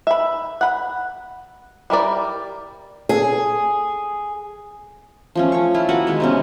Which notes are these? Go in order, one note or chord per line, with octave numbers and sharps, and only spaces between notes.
E5 B5
F#5 B5
G3 E4 A#4 D5
G#4
F3 A3 C#4
C#4 C#6
E4 F4
A#3 F#4 B4 F#5
B2 D#3 G#3
C3 B3 C#4